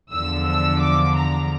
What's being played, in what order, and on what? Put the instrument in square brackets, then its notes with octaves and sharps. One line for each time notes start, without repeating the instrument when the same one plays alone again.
[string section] E2 D3 F3 E6
E6
D6
A#5